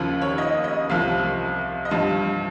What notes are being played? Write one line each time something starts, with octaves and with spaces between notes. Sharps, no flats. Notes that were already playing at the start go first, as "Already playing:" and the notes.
Already playing: D#2 C#3 F3
C#5
D#5
D#5
C2 C3 F3 F5
D#5
G2 F3 F5